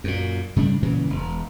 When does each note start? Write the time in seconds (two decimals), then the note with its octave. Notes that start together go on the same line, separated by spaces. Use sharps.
0.04 F#2 A#2
0.56 G#2 C#3 G3 D4
0.82 G2 A#2 C#3 E3
1.10 E1